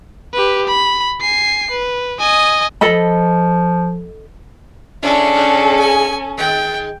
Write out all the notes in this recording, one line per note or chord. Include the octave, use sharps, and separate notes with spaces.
G4 B4
B5
G#5 C7
B4
D#5 G#5
F3 A4 D#5 B5
C#3 G#3 C#4 D4 E4 A4
G#2 C#3
G#5
D#3 G#3 G5